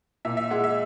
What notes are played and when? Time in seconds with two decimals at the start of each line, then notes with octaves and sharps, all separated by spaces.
0.25 A#2 E5
0.37 E5
0.50 G#3 F#5
0.64 E5